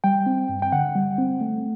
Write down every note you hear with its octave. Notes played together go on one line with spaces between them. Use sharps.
G3 G5
C4
G2
G5
D3 F#5
G3
C4
A3